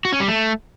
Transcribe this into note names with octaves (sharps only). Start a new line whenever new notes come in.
F#4
C#4
G3
A3